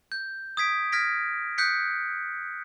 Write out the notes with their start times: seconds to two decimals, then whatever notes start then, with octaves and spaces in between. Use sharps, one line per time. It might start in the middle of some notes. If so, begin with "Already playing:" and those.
0.12 G6
0.57 D#6 G#6 B6 D7
0.92 F6 G#6 A#6 B6 D7
1.58 D#6 F#6 G6 B6 C#7